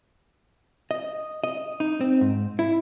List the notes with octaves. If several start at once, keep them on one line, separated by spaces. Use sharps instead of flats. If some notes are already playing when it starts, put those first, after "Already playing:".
D#5
D#5
D#4
C4
G#2
E4